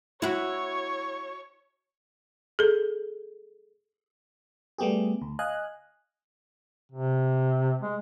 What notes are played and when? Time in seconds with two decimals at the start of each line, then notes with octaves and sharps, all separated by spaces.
0.22 E4 F#4 C#5
2.59 G#4 A4
4.78 G3 A3 B3 G4 G#4
5.22 D2
5.39 D#5 F5 G#5 F#6
6.92 C3
7.81 G#3